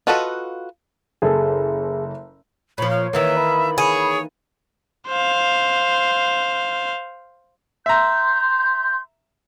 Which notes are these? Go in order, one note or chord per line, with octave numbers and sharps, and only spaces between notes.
F4 F#4 A4 B4 D#5
F#1 G#4 A4
A#2 F3 C#5 B5
F5
D#3 E3 A#3 E5
B5
G#4 C#5
C5 F5
E5 A#5 C6 G6